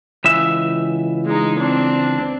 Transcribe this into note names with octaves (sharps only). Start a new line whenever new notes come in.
C#2 E3 E5
G#3 D#4
C4 D4